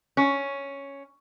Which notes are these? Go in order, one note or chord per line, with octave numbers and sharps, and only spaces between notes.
C#4